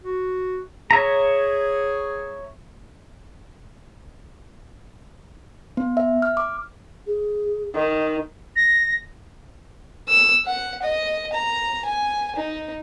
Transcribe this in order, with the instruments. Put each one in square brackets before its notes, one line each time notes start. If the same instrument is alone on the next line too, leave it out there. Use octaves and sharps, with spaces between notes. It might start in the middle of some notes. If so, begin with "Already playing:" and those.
[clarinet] F#4
[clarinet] G#4 [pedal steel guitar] C#5 E5 A#5
[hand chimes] B3
E5
F6
D6
[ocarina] G#4
[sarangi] D#3 [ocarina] D#4
[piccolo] A#6
[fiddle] E6
F#5
D#5
A#5
G#5
D#4